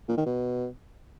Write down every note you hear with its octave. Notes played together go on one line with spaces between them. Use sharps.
A#2
D#3
B2